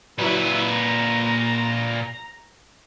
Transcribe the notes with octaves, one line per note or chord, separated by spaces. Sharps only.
A#2 F#3 E4 B4
A#5